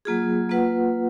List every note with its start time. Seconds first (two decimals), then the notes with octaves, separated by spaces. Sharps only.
0.05 F#3 A#3 F4 G#4
0.49 A#3 F4 B4 F#5